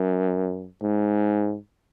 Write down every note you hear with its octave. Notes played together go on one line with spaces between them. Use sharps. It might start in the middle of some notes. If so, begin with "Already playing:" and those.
Already playing: F#2
G#2